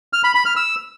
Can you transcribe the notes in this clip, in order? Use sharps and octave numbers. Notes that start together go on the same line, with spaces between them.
F6
B5
B5
F6
E6